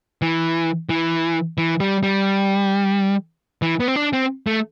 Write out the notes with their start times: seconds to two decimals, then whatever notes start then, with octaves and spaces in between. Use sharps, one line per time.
0.22 E3
0.89 E3
1.58 E3
1.80 G3
2.03 G3
3.62 E3
3.80 B3
3.88 C4
3.96 D4
4.13 C4
4.47 A3